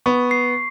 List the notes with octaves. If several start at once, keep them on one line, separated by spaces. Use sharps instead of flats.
B3 C#6
C7